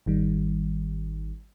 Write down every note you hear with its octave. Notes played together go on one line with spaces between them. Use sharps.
G#1 D#3 G3